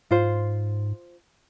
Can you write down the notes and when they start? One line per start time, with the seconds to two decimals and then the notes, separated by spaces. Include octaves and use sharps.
0.11 G#2 F4 C5